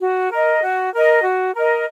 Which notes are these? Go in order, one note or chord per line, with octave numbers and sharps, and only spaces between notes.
F#4
A#4 D#5
F#4
A#4 D#5
F#4
A#4 D#5